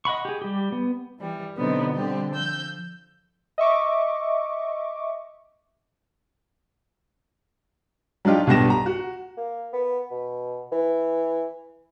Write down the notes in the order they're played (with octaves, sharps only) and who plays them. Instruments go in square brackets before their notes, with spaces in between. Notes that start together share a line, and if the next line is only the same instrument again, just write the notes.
[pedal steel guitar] D#5 F#5 B5 C#6
G4 G#4
G3 G4
B3
[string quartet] E3 G3
B2 D3 F#3 B3 C4 D#4
D3 G3 C4 G4
F3 E6 G6
[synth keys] D#5 E5 C#6 D6
[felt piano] F#3 D4 D#4 F4 G4
B1 G2 B3 G4 A#6 E7
A#5
F#4
[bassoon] A#3
B3
B2
E3